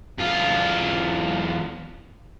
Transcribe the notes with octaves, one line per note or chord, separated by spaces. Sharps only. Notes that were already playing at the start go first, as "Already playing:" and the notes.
E2 F4